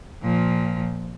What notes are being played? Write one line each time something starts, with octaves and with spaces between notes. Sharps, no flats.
A#2 F3